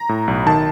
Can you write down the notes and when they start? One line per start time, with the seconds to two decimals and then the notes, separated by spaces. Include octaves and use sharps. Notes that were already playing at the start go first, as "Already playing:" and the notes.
Already playing: A#5
0.09 A2
0.28 B1
0.46 D#3 A5